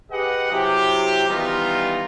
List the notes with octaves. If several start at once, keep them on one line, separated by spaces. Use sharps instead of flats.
G4 G#4 B4 D#5 F#5
C3 F#3 E4 G4
D#3 E3 G3 B3 D#4 F4